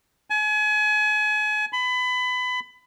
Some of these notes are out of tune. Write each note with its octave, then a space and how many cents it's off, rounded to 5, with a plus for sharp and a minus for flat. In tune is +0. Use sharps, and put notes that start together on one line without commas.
G#5 +35
B5 +25